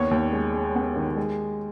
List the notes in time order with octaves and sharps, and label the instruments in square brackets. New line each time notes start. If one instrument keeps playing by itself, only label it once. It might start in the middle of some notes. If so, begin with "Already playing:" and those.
Already playing: [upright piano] D#2 B3 C#5
D#2
G#3
G#3
B3
D#3
G#3